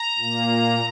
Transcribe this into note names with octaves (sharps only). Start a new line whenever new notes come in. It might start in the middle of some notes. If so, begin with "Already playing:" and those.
Already playing: A#5
A#2 A#3